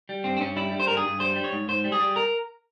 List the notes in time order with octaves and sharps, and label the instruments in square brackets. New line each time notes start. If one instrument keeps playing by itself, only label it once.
[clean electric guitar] G3
G2 C4
C4
G2 C#4
G3 E4
G3
C5
G2 A#4
G#4
G2
G3 C5
G3
C#5
G#2
G#2 C5
G3
G#4
G3
A#4